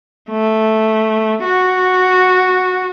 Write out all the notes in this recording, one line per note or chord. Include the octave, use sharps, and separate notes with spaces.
A3
F#4